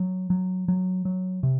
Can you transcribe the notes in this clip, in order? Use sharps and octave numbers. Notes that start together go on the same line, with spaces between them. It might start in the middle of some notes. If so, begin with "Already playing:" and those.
Already playing: F#3
F#3
F#3
F#3
C3